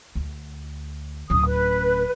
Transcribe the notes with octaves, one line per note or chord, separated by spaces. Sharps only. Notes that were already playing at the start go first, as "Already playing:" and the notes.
D2
D1 C#4 D#6
B4